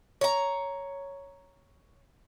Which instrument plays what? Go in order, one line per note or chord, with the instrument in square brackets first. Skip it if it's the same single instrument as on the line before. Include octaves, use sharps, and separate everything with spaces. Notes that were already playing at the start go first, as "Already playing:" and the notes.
[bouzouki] C#5 A#5